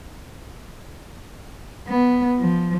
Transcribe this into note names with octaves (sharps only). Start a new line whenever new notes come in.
B3
F3